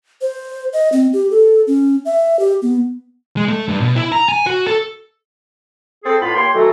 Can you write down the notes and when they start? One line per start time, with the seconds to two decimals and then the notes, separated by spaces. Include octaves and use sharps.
0.21 C5
0.73 D#5
0.92 C4
1.13 G4
1.31 A4
1.67 C#4
2.05 E5
2.39 G4
2.62 B3
3.37 G#3
3.48 A3
3.68 G2
3.80 B2
3.96 E4
4.12 A#5
4.29 G#5
4.47 F#4
4.67 A4
6.04 C4 G#4 A4
6.21 A2 B3 E4 F4 B5
6.35 A#3 G4 C#5 G5 C6
6.54 D#3 E3 F#3 A3 F#4 A4